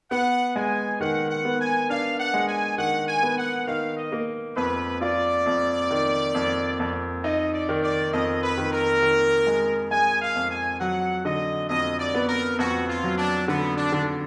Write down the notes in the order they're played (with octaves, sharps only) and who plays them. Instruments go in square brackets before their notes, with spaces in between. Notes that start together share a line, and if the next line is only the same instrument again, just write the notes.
[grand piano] B3 [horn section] F#5
[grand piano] G#3 [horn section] G#5
[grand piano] D#3 [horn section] F#5
[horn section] F#5
[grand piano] B3
[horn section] G#5
[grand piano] D4 [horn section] F5
[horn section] F#5
[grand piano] G#3
[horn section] G#5
[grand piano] D#3 [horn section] F#5
[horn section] G#5
[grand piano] B3
[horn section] F#5
[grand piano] D#3 [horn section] F5
[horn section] D#5
[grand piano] A#3
[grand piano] F2 [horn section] B4
[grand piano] F4 [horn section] D5
[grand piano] F2
D#3
F2
F2
[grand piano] D#4 [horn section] D#5
[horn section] D5
[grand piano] D#3
[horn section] D5
[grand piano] F2 [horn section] D#5
[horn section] B4
[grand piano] D#3
[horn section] A#4
[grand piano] D#3
G#3
[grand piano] G#3 [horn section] G#5
[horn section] F5
[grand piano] F2
[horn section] G#5
[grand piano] F#3 [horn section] F#5
[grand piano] D3 [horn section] D#5
[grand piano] F2 [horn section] D#5
[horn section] D5
[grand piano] B3
[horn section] A#4
[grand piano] F2 [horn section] F#4
[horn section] F4
[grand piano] F#3
[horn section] D4
[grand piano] D3 [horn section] B3
[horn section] D4
[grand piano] D3